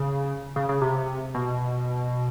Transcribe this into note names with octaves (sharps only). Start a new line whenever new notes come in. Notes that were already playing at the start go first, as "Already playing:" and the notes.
Already playing: C#3
C#3
C#3
C3
B2